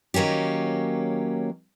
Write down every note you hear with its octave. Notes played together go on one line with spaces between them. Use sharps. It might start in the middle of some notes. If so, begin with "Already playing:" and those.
D#3 F#3 A#3 C#4 G4